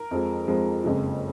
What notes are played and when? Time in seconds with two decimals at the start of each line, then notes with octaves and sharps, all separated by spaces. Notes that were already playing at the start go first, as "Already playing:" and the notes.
Already playing: A#4
0.11 F2 F3 G#3
0.47 F2 F3 G#3
0.84 F#1 F2 C#3 G#3